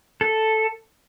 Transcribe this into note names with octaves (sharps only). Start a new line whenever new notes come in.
A4